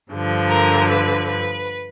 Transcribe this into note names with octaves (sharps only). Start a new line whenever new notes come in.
G2 D3 F3
A#4
B4
B4